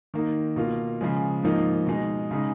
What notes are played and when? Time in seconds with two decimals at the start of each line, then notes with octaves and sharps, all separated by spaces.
0.14 D#3 A#3 D#4
0.56 B2 A#3 F4
1.01 C#3 F3 G#3
1.43 G#2 F3 A#3 D#4
1.87 B2 G#3 D#4
2.31 C#3 G#3 D#4